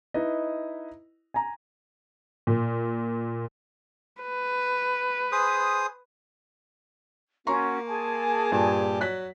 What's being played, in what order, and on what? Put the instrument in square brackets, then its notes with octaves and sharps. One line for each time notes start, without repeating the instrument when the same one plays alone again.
[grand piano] D#4 E4 B4 D#5
G#5 A#5
[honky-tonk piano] A#2
[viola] B4
[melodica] G#4 C5 D#6
[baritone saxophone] A#3 [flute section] C#4 F#4 [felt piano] A#5 C6 C#6
[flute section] G#4 G#5 A5
[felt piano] G2 A#2 [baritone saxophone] G4
[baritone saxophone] F#3 [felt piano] F#6 B6